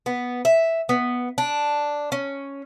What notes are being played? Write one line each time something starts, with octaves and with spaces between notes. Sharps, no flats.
B3
E5
B3
D4
C#4